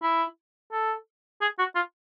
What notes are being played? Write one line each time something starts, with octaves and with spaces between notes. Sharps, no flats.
E4
A4
G#4
F#4
F4